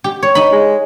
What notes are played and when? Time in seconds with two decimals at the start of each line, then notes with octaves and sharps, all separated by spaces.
0.04 G4
0.23 C#5
0.35 D#4 B5
0.52 G#3